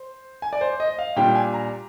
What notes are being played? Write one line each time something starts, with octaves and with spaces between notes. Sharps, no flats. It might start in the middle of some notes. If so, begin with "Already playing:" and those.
Already playing: C5
G#5
D5
C5
D#5
F5
A#2 G3 D4 G5
G#5
A#5